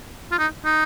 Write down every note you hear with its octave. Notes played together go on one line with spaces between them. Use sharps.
F4
D#4
D#4